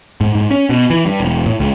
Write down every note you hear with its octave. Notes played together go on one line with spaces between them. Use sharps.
G#2
G#2
C#4
B2
E3
G2
E1
A2
C#2